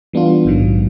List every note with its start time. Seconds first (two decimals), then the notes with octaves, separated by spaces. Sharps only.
0.13 E3 G3 B3 D4 F4
0.44 A#1 G#2 D#3 F#3